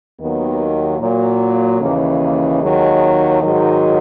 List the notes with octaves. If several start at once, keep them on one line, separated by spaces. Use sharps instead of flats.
D#2 D#3 F#3 B3
A#2 F#3
D#2 C#3 E3 A#3
A#3
D#2 D#3 F#3 G#3
G#2 D#3 F#3